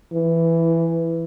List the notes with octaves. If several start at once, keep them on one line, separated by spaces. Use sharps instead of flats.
E3